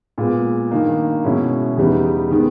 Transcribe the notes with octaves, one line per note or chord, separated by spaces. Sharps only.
A#2 G#3 B3
G2 D#3 A#3 D#4
B2 G#3 C#4 E4
E2 C#3 G3 B3 D#4
D#3 G#3 B3